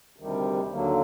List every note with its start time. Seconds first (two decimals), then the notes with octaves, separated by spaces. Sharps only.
0.17 D2 C3 D#3 G3
0.72 D#2 D3 F#3 A#3